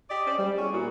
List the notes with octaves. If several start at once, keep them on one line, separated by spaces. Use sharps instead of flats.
G4 D5 D#5
C#4 C5 D5
G3
B3 C#4 E4 F#4 G#4
A#2 G3 A#3 E4 F#4